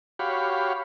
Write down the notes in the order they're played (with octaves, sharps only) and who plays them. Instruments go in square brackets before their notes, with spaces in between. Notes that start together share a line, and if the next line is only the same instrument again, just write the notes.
[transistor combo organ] F#4 G4 C#5 F5 B5